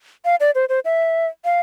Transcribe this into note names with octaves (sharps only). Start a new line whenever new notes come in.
F5
D5
C5
C5
E5
F5